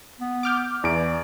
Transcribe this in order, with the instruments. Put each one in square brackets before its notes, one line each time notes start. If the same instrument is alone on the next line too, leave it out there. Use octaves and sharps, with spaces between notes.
[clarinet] B3
[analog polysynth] D6 F6 G6
[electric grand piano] E2 D7 [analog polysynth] E3 [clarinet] D5